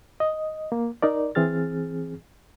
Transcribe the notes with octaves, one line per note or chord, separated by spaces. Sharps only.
D#5
A#3
D#4 A#4 D5
E3 C4 G#4 F6 A6